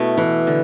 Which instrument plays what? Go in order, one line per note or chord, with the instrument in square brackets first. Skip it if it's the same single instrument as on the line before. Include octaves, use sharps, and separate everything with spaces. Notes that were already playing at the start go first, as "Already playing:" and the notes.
Already playing: [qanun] B2 A3 E4 B4
[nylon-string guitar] E3
[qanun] D3